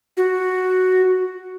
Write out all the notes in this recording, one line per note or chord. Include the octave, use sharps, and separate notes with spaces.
F#4